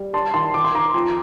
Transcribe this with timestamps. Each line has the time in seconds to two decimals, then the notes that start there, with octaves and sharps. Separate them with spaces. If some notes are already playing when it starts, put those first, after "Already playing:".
Already playing: G3
0.13 D4 A5 C6
0.34 D#3 A5 C6
0.54 D#3 D6
0.64 C6
0.74 D#3 A#5 D6
0.94 F2